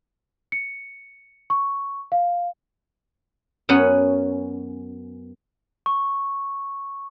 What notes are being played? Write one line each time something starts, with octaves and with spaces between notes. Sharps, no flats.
C#7
C#6
F5
F#2 B3 C#4 F#5
C#6